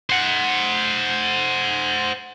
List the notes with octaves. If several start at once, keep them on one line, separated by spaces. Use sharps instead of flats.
C5 F#5